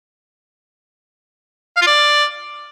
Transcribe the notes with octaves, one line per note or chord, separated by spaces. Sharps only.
F5
F4
D5